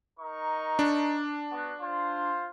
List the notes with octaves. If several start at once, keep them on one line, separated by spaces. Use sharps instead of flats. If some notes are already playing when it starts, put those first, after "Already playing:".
D#4 A#4 C#6
D4
B3 F#4
F4 C5 C6